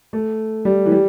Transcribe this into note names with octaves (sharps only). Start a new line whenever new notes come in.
A3
G3
E3
G3